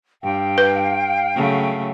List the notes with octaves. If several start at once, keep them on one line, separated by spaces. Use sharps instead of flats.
G2 F5 G5
B4
C#3 F#3 A3